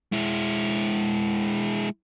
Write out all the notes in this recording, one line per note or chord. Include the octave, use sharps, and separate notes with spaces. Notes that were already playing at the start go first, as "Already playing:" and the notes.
G#3 E4